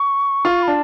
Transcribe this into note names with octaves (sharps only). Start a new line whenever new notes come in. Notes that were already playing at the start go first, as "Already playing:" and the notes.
Already playing: C#6
F4
B5
D4 A5